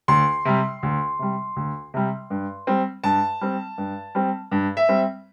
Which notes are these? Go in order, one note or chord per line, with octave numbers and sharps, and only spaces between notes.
D2 C6
C3 G3
D2
C3 G3
D2
C3 G3
G2
G3 C4
G2 A5
G3 C4
G2
G3 C4
G2
E5
G3 C4